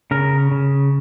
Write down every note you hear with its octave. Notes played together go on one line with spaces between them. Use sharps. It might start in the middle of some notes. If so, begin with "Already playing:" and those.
C#3 A#4
C#3